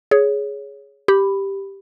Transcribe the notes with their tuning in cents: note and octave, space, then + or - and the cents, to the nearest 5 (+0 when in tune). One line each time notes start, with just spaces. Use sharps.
G#4 +5 C#5 +5
G4 +0 B5 +5